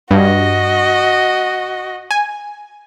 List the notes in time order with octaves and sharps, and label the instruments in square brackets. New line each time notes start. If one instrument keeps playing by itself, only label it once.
[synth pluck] G2 [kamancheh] F#4 D#5
[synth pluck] G#5